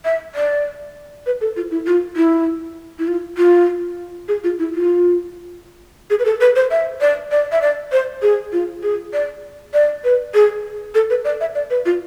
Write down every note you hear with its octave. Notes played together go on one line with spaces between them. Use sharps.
E5
D5
B4
A4
F4
E4
F4
E4
E4
F4
F4
G#4
F4
E4
F4
G#4
B4
A4
B4
C5
E5
D5
D5
E5
D5
C5
G#4
F4
G#4
D5
D5
B4
G#4
A4
B4
D5
E5
D5
B4
F4